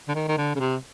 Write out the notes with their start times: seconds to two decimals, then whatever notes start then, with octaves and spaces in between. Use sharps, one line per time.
0.08 D3
0.15 D#3
0.28 D#3
0.38 D3
0.56 C#3
0.60 C3